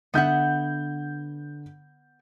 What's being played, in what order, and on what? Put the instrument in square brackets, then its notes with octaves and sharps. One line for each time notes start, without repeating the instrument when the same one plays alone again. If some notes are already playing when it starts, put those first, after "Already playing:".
[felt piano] D3 G6 [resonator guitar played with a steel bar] B3 E5 F#5